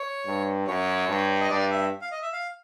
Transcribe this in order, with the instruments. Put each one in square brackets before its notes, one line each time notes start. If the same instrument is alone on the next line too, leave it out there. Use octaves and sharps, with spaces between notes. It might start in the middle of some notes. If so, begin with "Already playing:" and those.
Already playing: [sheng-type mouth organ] C#5
[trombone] G2
[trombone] F#2 [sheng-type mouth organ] C#5
[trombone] G2
[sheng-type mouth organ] D#5
[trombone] G2 [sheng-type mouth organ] D5
[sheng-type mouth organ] E5
F5
D#5
E5
F5